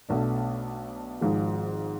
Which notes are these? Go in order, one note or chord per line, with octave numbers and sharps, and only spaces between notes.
B1 B2 A3 D4
G#1 G#2 F3 G#3